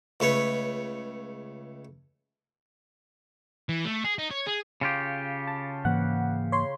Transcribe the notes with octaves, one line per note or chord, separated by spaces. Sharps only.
C#2 A3 B4 C#5
E3
A3
G#4
D#4
C#5
G#4
C#3 F4 G4
A5
G#2 E3 A#3 F#5
C#5 C6